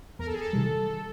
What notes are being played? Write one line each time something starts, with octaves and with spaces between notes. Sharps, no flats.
E2 A#4
A4
G#4
A4
C3 D#3 G3